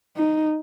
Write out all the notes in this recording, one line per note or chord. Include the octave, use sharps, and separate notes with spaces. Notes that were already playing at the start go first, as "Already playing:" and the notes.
D#4